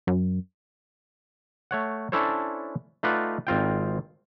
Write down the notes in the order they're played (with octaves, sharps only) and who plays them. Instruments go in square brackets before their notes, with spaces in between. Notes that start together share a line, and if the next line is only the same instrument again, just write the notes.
[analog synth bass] F#2
[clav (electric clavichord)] A3 C#5 F#5
C#4 D4 E4 A4 C5 C#5
A3 D#4 F4 B4 D5 F#5
G#1 C4 F4 G5